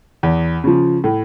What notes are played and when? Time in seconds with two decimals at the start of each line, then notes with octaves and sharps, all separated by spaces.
0.23 E2
0.64 C#3 F3
1.04 A2